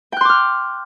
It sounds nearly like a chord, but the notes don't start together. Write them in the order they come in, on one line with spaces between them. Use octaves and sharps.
G5 F#6 C6 D6 F6